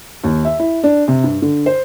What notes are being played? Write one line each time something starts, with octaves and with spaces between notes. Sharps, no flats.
D#2
E5
E4
D4
C3
G2
D3
C5